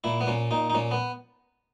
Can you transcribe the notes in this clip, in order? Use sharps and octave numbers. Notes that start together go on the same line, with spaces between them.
A#2 E4
B3
A#2 C#4
A#2 D#4
D#4
A#2 C#4
B3